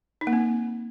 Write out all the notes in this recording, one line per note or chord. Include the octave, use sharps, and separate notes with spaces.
D#4
A#3
C4